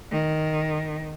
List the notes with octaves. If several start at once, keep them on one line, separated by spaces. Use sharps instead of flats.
D#3